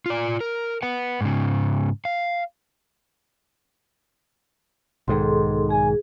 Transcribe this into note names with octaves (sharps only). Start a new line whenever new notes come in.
F4 D5
A#4
B4 F#5
G#2 C#3
F5
B1 G#2 D#3 G#4 A4 C6
G#4 G#5